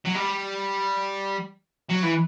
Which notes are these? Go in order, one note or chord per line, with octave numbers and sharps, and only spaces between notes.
F#3
G3
F#3
E3